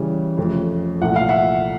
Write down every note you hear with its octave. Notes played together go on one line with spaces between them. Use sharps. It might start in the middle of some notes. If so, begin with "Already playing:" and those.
Already playing: C#3 E3 G3
F2 C#3 F3 A3
C2 A#2 F3 A3 F#5
F5
E5 F#5